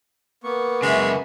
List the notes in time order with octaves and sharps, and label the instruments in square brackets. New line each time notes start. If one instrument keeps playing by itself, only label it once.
[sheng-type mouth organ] A#3 B3 C#6
[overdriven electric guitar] F#2 C#3 [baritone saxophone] G#3 [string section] E5 G#5